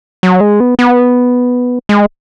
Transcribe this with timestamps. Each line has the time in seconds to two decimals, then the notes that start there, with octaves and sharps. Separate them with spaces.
0.23 F#3
0.40 G#3
0.60 B3
0.79 B3
1.89 G#3